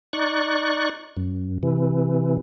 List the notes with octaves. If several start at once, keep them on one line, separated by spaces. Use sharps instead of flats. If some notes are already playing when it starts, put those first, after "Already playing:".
D#4 D5 C#6 F#6
F#2
C3 E3